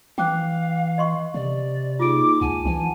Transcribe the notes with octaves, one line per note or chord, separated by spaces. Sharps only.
E3 F5 G5 D6 F#6
D#5 C6 C#6
C3 D5
A#3 D#4 F4 G#4 D6 D7
C#2 F#5 G#5 A5
E3 G#5